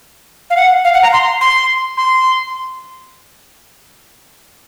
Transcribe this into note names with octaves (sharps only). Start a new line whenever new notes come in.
F5
F#5
F5
F#5
A#5
C6
C6
C6